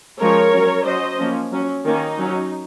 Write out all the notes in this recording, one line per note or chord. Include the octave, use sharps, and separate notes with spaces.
F3 G#3 C#4 A#4 C#5
F#3 C#4
F#3 C#4 C5 D#5
F3 A#3 C#4
F#3 C#4
D#3 A#3 C#4 D#4
F#3 C#4